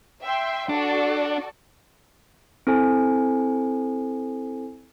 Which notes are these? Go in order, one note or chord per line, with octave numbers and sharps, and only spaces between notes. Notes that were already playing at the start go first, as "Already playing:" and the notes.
E5 G5 C6
D4 F#4 A4 D5
C4 E4 A4 C5 G#5